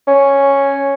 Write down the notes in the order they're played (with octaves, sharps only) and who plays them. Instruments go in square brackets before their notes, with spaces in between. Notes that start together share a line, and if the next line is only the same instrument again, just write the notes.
[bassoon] C#4